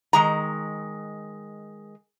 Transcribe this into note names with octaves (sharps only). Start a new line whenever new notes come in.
D#3 G#3 A#5